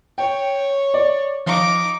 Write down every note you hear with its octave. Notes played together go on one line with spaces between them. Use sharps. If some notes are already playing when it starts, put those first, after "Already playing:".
C#5 G5
D5
F3 D#4 D6